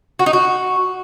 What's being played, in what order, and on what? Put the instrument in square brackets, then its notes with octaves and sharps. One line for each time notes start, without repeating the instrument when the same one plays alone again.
[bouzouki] F#4
D#4
F#4